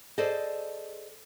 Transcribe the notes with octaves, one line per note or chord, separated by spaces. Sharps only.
G#4 A4 C5 D5 D#5